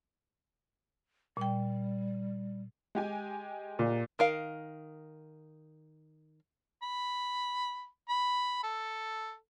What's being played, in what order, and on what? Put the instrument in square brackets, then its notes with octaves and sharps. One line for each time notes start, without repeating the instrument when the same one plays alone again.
[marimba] A#2 G5 [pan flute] G3
[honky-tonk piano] G#3 G4 G#5
[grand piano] A#2
[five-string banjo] D#3 A#4 F5
[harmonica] B5
B5
A4